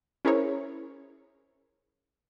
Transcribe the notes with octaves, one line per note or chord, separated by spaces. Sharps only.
C#4 E4 G#4 A#4 C5 C#5